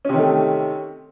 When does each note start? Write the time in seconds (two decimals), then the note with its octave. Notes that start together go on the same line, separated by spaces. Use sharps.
0.05 C#4
0.09 C3
0.14 D#3
0.18 A3